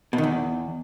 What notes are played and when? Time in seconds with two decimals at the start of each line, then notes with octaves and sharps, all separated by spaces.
0.13 B2
0.18 D#3
0.23 E2